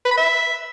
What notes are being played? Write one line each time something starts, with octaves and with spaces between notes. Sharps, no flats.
B4
B5
E5